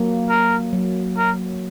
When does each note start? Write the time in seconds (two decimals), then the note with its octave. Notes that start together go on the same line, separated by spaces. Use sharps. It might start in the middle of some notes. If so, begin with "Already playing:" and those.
Already playing: F#3 A#3
0.29 A#4
0.73 F#3
1.17 A#4